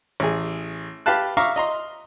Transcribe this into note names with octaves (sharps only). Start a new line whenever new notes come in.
A1 G#4
G4 B4 F5 A5 F#6
E5 F5 A#5 C#6 D6
D#5 A#5 C6